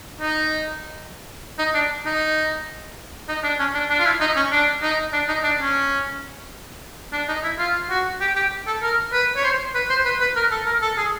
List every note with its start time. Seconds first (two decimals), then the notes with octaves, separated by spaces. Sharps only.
0.21 D#4
1.59 D#4
1.74 D4
2.06 D#4
3.29 D#4
3.44 D4
3.59 C#4
3.74 D4
3.90 D4
3.99 F4
4.05 E4
4.21 D#4
4.36 C#4
4.51 D4
4.82 D#4
5.13 D4
5.29 D#4
5.44 D4
5.59 C#4
7.13 D4
7.28 D#4
7.44 E4
7.59 F4
7.90 F#4
8.21 G4
8.36 G4
8.67 A4
8.82 A#4
9.13 B4
9.36 C#5
9.44 C5
9.75 B4
9.90 C5
10.05 B4
10.20 B4
10.36 A#4
10.52 A4
10.66 A#4
10.82 A4
10.98 G#4